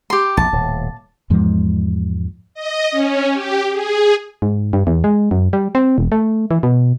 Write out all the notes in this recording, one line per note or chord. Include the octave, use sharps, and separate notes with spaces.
G4 C6
A#1 E2 A5
D#1 A2
E2 G#2 F3 G#3
D#5
C#4
G4
G#4
G#2
G2
E2
G#3
F#2
G3
C4
E1
A3
E3
B2